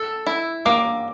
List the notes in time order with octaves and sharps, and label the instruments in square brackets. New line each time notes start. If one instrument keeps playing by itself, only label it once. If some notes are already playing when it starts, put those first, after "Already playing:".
Already playing: [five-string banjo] A4 [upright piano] E6
[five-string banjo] E4
[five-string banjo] A#3 [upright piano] D6